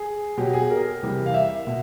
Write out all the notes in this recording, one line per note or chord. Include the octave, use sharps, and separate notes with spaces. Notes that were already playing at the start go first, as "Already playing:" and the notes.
Already playing: G#4
B2 F#3 G4
G#4
A#4
C3 E3 G3
F5
E5
B2